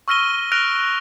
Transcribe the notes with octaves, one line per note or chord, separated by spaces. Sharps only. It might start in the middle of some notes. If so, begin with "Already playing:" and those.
C#6 E6 F6 A#6 D#7 G7
F6 F#6 A#6 D7 F7